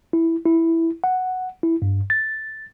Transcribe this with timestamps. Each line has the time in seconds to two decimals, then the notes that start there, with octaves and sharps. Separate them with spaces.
0.13 E4
0.45 E4
1.04 F#5
1.63 E4
1.82 G2
2.10 A6